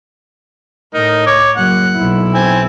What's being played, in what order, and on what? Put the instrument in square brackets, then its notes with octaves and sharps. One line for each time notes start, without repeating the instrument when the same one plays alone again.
[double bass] A2 [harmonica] D#4 A#4
[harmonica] C#5 D6
[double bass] F#1 F#2 [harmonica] F#5
[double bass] B1 E4
[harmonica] C4 G#5